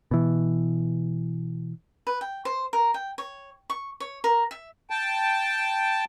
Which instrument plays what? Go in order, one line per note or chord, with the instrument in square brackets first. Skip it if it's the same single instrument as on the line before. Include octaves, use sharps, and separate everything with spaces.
[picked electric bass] B2 E3
[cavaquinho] B4
G5
C5
A#4
G5
C#5
C#6
C#5
A#4
E5
[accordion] G5 A5